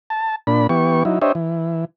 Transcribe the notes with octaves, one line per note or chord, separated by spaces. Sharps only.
A5
A#2 D4 B5
E3 B3 G4 C#6
F#3 D#4 E4
D4 G4 C5 C#5 D#5 E5
E3